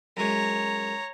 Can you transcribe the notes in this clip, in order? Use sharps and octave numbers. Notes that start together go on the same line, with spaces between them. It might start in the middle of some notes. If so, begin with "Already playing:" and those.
F#2 G#3 C#5 A#5